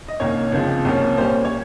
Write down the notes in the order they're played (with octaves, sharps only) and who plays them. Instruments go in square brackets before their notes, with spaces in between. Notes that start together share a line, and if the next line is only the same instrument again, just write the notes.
[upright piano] D#5
C2 C3 D#3 A#3 C#4 C#5
C#2 C3 F3 G#3
C2 C3 F3 A#3 C#4
A#2 G3 C#4 C5
C#5